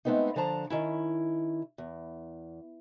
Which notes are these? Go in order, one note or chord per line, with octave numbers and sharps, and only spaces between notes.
G#3 A3 B3 C4 D#4
D3 F3 D4 A5 A#5
D#3 C#4 E4
E2